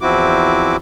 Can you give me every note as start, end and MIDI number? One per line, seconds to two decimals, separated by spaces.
0.01 0.76 40
0.01 0.76 53
0.01 0.76 60
0.01 0.76 64
0.01 0.76 66
0.01 0.76 86